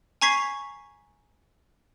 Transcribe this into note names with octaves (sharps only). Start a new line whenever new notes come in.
G#5 A#5 C#6 G#6 B6 C7